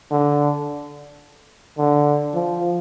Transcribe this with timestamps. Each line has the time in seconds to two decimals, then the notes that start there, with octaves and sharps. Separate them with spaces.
0.11 D3
1.78 D3
2.34 F3